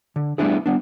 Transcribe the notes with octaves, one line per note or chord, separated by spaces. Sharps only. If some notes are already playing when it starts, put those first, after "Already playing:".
D3
G3 A3 B3 D4 E4 G#4
G3 B3 D4